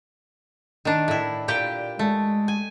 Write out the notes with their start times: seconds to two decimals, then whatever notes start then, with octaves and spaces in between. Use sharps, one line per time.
0.85 D#3 D4
1.08 A2 E4
1.48 A#2 G4 G5
1.99 G#3 A3
2.48 G#5